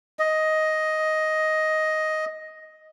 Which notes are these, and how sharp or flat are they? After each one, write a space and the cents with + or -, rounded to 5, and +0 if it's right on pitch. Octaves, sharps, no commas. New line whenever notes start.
D#5 +5